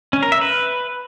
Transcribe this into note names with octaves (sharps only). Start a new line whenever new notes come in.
C#4
A#4
E5
B4